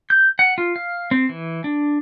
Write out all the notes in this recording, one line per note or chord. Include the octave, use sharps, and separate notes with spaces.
G6
F#5
F4
F5
C4
E3
D4